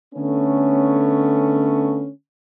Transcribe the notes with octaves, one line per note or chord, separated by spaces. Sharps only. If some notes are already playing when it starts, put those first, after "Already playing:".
D3 A3 B3 C#4